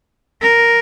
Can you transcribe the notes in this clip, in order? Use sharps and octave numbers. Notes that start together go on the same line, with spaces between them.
A#4